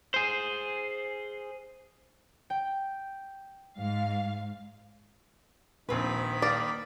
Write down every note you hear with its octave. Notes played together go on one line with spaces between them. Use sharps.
G#4 C5
G5
G#2 F5
D#1 A#1 D#3 C4 B4 B5
A#3 D5